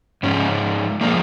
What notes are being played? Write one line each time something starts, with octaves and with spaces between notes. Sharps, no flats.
G#2 F3 G#3 C#4
F3 G#3 A#3